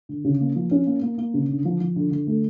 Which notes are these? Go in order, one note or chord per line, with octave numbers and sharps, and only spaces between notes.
D3
C#3
A#3
F3
C#4
A#3
A#3
A#3
C#3
D3
F3
F3
D3
D3
A3